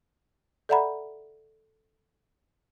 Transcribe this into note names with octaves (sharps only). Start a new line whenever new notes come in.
A4 D5 E5 F#5 A#5 B5